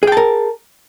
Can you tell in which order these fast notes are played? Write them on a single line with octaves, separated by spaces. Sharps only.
G#4 G5 A5 A#4